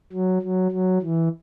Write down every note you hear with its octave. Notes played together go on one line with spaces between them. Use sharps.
F#3
F#3
F#3
E3